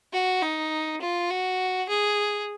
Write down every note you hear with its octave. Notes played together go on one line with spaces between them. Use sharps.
F#4
D#4
F4
F#4
G#4